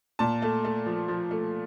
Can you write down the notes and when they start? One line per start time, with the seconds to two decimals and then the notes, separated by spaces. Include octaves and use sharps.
0.19 A#2 A5
0.42 A3
0.65 A3
0.86 F3
1.08 F3
1.31 A3